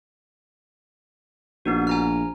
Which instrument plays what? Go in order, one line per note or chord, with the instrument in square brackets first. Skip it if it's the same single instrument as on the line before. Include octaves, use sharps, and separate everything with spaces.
[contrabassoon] A#1 [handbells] B3 D#4 F#4
[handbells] G#5 A#5 F6